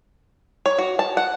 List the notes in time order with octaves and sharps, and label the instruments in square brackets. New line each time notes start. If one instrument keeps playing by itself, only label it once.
[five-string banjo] C#5
F#4
A5
F#5